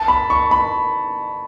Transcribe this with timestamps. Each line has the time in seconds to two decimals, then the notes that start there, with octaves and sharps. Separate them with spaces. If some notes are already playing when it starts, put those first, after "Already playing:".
Already playing: A5
0.08 B5
0.30 C#6
0.51 B5